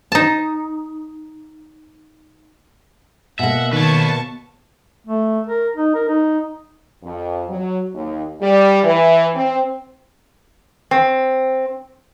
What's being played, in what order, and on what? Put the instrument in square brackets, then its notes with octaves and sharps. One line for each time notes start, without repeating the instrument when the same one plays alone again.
[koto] D#4 A5
[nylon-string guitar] B2 A#3 [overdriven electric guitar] E5 [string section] F#5
[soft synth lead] D#3 [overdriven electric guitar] B4 C#5 [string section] A5 C#6
[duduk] A3
A#4
D#4
A#4
D#4
[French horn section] F2
F#3
D#2
G3
E3
C4
[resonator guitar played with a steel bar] C4